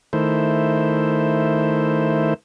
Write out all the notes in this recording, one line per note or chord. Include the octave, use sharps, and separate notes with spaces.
D#3 A3 E4 C5